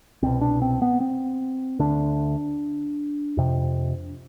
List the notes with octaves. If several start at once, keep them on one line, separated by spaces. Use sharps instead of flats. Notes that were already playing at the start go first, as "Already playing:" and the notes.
C2 B2 C4
D4
C4
B3
C4
D2 D3 D4
F2 C3